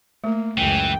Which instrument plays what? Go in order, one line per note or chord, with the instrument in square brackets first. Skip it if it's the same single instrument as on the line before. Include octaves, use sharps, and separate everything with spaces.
[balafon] A3 [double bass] A#3
[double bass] C#2 F#2 [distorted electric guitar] E3 [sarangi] G5